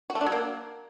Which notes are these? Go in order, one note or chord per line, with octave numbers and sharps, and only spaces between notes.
F#4
A3
D4
F#3
A#3